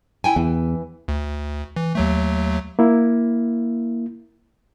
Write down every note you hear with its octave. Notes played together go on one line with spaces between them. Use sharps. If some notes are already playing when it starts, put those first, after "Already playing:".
E4 G5 G#5
E2 E3
D2
E3
D#2 F#3 A3
A#3 E4